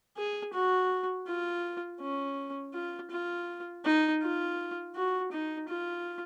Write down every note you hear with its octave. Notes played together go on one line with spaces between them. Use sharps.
G#4
F#4
F4
C#4
F4
F4
D#4
F4
F#4
D#4
F4